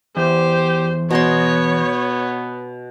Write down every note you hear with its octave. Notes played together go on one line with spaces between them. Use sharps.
E2 G4 C5
B2 B3 C#5 D#5 C6